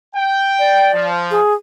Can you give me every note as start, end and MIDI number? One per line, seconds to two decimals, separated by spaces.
0.15 0.88 79
0.59 1.06 74
0.93 1.39 53
1.31 1.54 68